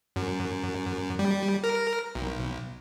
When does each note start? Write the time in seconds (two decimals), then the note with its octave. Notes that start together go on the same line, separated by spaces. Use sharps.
0.16 F#2
1.19 G3
1.64 A#4
2.15 B1